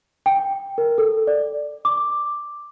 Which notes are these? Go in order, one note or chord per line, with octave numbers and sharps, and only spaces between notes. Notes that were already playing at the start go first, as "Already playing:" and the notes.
G5
A#4
A4
D5
D6